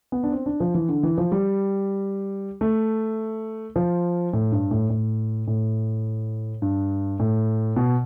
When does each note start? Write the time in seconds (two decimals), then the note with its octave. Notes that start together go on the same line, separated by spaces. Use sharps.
0.12 B3
0.23 D4
0.32 C4
0.46 D4
0.60 F3
0.75 E3
0.89 D3
1.03 E3
1.18 F3
1.32 G3
2.61 A3
3.76 F3
4.33 A2
4.52 G2
4.71 A2
4.90 A2
5.47 A2
6.62 G2
7.19 A2
7.76 B2